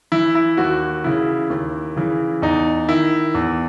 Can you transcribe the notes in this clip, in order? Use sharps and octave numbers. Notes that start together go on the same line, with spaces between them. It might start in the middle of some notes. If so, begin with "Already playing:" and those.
E3 E4
E4
D#2 F#4
C#3 E3 E4
D#2
C#3 E3
E2 D#4
D#3 E4
E2